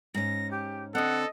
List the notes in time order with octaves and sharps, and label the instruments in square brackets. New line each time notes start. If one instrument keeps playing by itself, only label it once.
[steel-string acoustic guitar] G#2 C#4 [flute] A#6
[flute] G4
[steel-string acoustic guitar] D3 C4 [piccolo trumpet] A4 [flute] D#5 [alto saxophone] F#5